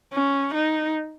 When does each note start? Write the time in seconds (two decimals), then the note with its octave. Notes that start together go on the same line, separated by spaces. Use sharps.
0.13 C#4
0.54 D#4